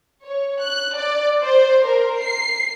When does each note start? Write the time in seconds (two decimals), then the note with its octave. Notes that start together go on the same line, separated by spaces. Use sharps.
0.23 C#5
0.60 F#6
0.95 D5
1.43 C5
1.85 A#4
2.22 C7